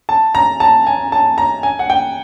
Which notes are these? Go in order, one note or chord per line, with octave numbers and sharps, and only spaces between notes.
A5
A#5
A5
G#5
A5
A#5
G#5
F#5
G5